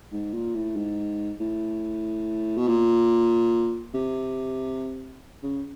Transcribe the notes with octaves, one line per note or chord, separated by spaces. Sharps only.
G#2
A#2
A2
G#2
A2
B2
A#2
C3
C#3